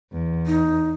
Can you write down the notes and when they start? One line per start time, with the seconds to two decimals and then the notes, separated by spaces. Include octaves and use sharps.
0.12 E2
0.47 D#4